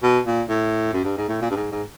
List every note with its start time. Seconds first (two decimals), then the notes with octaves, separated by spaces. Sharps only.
0.03 B2
0.26 A#2
0.49 A2
0.93 F#2
1.04 G2
1.17 G#2
1.28 A2
1.42 A#2
1.50 G2
1.56 G#2
1.72 G#2